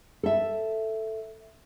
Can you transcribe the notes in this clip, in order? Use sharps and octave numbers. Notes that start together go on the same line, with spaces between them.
A4 E5